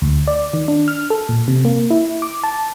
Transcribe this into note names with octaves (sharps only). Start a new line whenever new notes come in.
D2
D5
D#3
D4
F6
A4
A#2
C3
A#3
E4
D6
A5